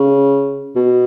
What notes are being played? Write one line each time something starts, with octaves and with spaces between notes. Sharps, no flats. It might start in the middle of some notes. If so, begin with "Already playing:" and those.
Already playing: C#3
B2